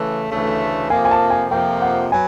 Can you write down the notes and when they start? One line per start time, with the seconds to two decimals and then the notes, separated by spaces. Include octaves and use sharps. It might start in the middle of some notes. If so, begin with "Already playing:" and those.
Already playing: C#3 E3 A3
0.29 D2 C#3 E3 A3
0.90 F2 C3 F3 A#3 G#5
1.05 G#5
1.11 A5
1.30 G#5
1.51 F2 C3 F3 A#3 G5
1.82 F#5
2.12 F#3 B3 G#5